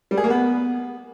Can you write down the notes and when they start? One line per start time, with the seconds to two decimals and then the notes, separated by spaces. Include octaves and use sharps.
0.11 G3
0.17 G#4
0.24 A#3
0.30 B3